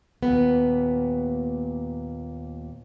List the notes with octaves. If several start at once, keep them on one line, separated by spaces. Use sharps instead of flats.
D#2 A#2 B3